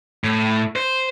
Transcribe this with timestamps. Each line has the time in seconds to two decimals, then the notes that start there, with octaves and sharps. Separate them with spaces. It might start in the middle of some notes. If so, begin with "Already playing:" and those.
0.24 A2
0.76 C5